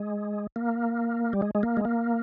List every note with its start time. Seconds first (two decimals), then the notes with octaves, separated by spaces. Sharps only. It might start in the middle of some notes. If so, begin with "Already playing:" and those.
Already playing: G#3
0.56 A#3
1.33 G3
1.42 G#3
1.55 G#3
1.63 A#3
1.77 G#3
1.85 A#3